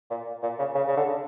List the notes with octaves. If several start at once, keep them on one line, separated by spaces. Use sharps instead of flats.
A#2
A#2
C#3
C#3
C#3
D3